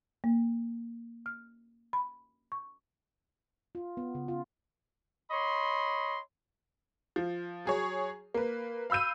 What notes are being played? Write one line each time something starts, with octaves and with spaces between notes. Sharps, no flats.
A#3
F6
B5
C#6
F4
B3
C#3
F4
C#5 D#5 B5 C6
F3
F#3 G#4 C#5
A#3 B4
F5 B5 E6 G6 D#7